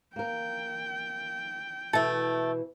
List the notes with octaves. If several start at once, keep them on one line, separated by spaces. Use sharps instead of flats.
A#3 A#4 G5
B2 E3 A3 E4 A4